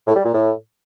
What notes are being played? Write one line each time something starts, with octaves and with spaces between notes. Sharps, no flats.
A2
G3
A#2
A2